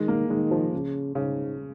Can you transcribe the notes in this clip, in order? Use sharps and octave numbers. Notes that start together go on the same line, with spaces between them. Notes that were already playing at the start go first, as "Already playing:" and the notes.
Already playing: D#3 G#3
A#3
D#3 G#3
F3
C#3
G#2 C#3